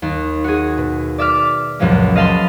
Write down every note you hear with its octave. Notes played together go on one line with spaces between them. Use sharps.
D#2
F#4 G#4
B2
D5 E5 D6 F6
C#2 F#2 A#2 F3 G#3
D#5 F5 A5 B5 C6